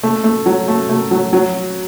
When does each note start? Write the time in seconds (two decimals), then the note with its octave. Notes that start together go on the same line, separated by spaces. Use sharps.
0.03 A3
0.24 A3
0.46 F#3
0.68 A3
0.89 A3
1.11 F#3
1.33 F#3